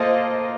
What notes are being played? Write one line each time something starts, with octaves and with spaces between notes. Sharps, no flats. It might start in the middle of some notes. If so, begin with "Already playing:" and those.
Already playing: A#3 F4 A4 C5 D#5